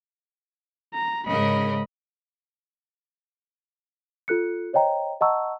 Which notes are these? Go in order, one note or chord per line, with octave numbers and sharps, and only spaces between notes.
A#5
G#2 C#3 A#4 D#5 B5
F4 A4 F#6 C#7
C5 C#5 D#5 G5 A#5
D#5 F#5 A5 A#5 C#6 E6